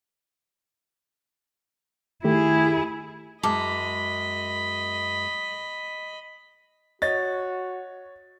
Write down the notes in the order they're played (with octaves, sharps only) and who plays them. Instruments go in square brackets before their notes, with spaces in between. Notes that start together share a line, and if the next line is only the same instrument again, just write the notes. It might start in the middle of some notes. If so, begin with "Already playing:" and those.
[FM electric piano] D#3 A3 G4 [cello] E4 G#4
[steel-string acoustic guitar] F#2 G#3 [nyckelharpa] D#5 B5 [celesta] A5 D6
[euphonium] F#4 [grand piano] C#5 [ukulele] D#5 [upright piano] A6